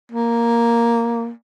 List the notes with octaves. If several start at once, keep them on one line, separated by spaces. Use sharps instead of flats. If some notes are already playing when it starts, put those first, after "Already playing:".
A#3